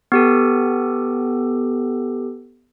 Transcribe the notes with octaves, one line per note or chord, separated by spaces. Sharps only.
B3 G4 A4